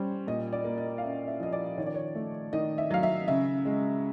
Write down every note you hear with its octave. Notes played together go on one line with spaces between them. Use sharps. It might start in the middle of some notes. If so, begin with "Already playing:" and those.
Already playing: G3 C#4 C5
A#2 D#5
D5
A#3
D#5
F5
C#4 E5
E5
F3 D#5
D5
D#3 C#5
D5
C#5
A3
D#3 D#5
E5
F#3 F5
E5
C#3 E5
G#3